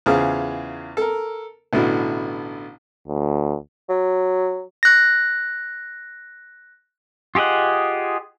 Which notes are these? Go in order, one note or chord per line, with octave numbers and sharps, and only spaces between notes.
E2 C#3 F4 G#4 C5 F6
A4 A#4
A1 B2 D3 E4
D2
F#3
F#6 A#6
F4 G4 G#4 D#5 F#5